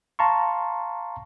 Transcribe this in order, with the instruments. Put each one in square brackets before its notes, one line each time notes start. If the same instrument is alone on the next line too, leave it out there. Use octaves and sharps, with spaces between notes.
[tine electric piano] F5 A5 A#5 C6 C#6